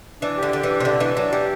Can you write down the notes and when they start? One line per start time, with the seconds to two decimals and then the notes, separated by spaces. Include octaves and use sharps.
0.22 E3 D4
0.37 G4
0.43 D3
0.53 D3 G4
0.63 E3
0.68 D4
0.80 C3
0.85 D3 D4
1.00 E3 D4
1.16 F#3 D4
1.32 E3 G4